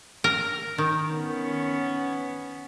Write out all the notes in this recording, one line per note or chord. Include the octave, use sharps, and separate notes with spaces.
A#4
D#3
B3 C#4